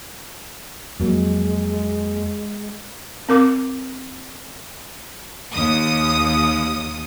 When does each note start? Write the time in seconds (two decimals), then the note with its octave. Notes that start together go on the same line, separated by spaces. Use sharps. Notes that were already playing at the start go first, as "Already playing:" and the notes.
1.00 F2 F#3 G#3 A#3
3.29 C4 A#4 D6
5.52 D#2 D#6